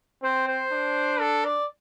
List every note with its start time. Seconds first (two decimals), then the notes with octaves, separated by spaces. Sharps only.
0.23 C4 C5
0.48 C5
0.72 D4
1.21 A4
1.45 D5